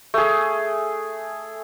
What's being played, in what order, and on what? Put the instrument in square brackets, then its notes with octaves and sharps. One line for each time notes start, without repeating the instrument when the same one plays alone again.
[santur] A3 G#4